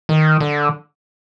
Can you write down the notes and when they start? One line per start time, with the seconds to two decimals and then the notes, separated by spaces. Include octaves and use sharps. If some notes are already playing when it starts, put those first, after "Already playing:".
0.09 D#3
0.41 D3